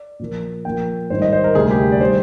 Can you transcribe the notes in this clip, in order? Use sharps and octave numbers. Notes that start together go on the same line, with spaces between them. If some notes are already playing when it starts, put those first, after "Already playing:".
Already playing: D5
A#2 F3 A#3
A#2 F3 A#3 G5
G#2 D#3 G3 C5
D#5
C5
A#4
D2 C3 G3 A#3 G#4
G4
D5
D#3 G3 C5